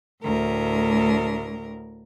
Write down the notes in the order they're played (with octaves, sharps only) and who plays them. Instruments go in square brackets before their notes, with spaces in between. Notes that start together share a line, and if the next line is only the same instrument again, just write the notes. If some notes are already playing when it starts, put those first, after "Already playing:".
[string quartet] D2 A2 A#4